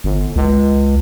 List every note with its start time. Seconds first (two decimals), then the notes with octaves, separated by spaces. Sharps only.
0.04 G1
0.36 C#2